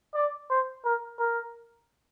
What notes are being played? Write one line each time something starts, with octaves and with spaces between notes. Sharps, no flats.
D5
C5
A#4
A#4